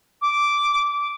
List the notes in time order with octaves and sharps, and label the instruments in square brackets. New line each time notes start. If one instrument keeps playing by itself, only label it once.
[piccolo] D6